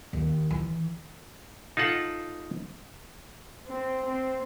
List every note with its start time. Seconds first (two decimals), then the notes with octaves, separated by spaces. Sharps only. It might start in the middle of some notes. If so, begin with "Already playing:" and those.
0.13 D#2
0.51 E3
1.77 D#4 F4 A4 F#5
3.69 C4
4.05 C4